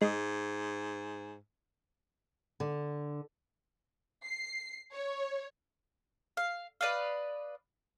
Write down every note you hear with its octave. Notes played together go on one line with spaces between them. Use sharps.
G#2 G#3
D3
C7
C#5
F5
B4 D5 D#5 F5